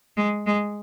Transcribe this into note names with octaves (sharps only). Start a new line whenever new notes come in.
G#3
G#3